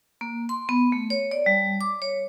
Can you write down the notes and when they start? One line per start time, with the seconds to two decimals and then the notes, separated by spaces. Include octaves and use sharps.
0.21 A#3
0.49 C6
0.69 B3
0.92 A3
1.10 C#5
1.31 D5
1.46 G3
1.81 D6
2.02 C#5